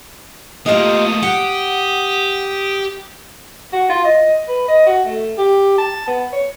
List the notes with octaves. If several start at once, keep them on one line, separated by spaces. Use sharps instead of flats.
A3 A#3 F4 G4 D#5 D#6
G4 F#5
F#4
F4
D#5
B4
D#5
F#4
A3
G4
A5
B3
C#5